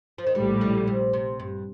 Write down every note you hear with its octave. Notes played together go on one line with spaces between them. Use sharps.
F3
D#3
A#1 A2 D3 G3
D3
C3
C3
G2